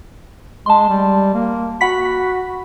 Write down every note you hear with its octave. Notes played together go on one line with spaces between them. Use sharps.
G#3 A5 C6
G3
A#3
F#4 F#5 B5 B6